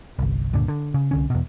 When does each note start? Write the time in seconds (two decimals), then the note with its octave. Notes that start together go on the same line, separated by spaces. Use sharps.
0.19 G1 C2
0.53 C#2 G2 A#2 D3
0.68 D3
0.94 C#3
1.11 C2 D3 C#4
1.30 E2 B2